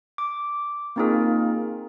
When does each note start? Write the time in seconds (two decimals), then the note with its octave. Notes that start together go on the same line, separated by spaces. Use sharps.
0.18 D6
0.96 A#3 C4 D#4 F4 G#4 A#4